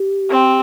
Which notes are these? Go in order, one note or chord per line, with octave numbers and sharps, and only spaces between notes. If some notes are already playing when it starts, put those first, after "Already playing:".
Already playing: G4
C4